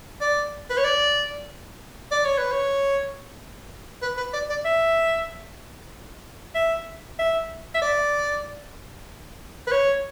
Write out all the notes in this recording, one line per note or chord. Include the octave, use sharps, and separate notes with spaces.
D5
B4
C#5
D5
D5
C#5
B4
C#5
B4
B4
D5
D5
E5
E5
E5
E5
D5
B4
C#5